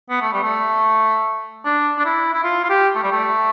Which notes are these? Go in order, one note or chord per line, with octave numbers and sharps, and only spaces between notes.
B3
A3
G3
A3
D4
D4
E4
E4
F4
F4
G4
A3
G3
A3